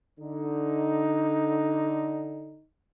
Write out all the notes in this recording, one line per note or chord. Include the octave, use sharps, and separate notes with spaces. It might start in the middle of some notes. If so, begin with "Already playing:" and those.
D3 D#4